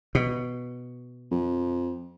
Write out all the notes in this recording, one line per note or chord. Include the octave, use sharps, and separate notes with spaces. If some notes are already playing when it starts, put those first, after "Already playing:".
B2
F2